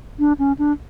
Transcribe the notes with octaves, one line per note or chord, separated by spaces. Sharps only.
D4
C#4
D4